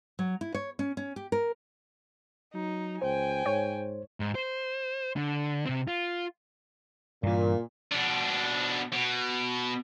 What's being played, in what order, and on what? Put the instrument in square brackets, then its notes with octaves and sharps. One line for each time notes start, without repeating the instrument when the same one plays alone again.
[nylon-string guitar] F#3
E4
C#5
C#4
C#4
G4
A#4
[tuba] F#3 [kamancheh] D#4
[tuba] C#2 [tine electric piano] C5 [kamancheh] G5 G#5
[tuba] G#2 [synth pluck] C#5
[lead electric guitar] G#2
C5
D3
C3 C4
F4
[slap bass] G2 E3 [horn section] A#2
[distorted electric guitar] B2 D4
B2